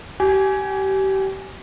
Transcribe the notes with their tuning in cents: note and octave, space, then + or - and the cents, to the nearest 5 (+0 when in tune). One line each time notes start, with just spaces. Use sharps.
G4 -30 G#5 +0